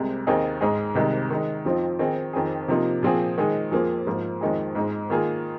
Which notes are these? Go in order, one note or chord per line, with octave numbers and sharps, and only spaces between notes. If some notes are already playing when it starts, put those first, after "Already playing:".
Already playing: C2 C3 G#3
D#2 D#3 C4 D#4 G#4
G#2 G#3 D#4 G#4
C2 C3 D#3 G#3 D#4
D#3 G#3 D#4
F2 F3 C4 D#4
D#3 C4 D#4 G#4
F2 D#3 C4 G#4
C3 F3 A#3 D#4
A#2 F3 C4 G#4
D#3 G#3 D#4 G#4
F2 F3 A#3 G#4
G#2 F3 A#3
F2 D#3 G#3 D#4 G#4
G#2 G#3 D#4
D#3 A#3 F4 G#4